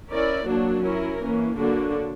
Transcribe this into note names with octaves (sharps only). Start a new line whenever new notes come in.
C#4 E4 A#4 D5
F#3 A#3 D4 F#4
C#4 E4 A#4
E3 A#3 C#4
D3 F#3 A#3 D4 F#4